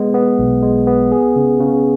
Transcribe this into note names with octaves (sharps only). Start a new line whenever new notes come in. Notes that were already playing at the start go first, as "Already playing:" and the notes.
Already playing: G#3 B3
B3
B1
G#3
B3
G#4
C#3
C#3